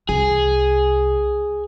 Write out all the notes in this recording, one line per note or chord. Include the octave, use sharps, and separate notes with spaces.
C2 G#4